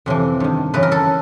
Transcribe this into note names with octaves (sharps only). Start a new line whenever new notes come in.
F2 C3 E3
G2 D#3
F#2 C#3 E3 B4
A#4
A4